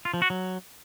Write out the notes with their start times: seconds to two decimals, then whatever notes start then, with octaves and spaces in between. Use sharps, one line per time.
0.05 F4
0.14 F3
0.22 F#4
0.30 F#3